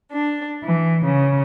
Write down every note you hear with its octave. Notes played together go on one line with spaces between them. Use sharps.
D4
E3
C#3